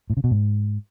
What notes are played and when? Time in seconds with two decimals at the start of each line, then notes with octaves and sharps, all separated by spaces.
0.10 A2
0.17 C#3
0.24 B2
0.31 G#2